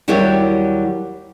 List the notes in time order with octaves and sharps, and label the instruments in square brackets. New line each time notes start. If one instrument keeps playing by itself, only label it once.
[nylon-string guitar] D#2 F#3 G3 E4 G4 C#5